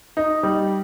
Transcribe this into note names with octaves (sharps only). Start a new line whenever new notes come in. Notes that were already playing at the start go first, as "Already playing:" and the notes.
D#4
G3